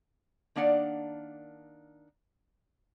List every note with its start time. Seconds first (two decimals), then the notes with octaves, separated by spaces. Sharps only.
0.56 D#3 A#3 D4 D5 F#5